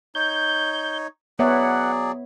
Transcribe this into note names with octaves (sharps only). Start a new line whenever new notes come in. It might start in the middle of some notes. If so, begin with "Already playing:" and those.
D#4 C#5 G6
F#3 B3 G#4 C#5 D5 E5 F#5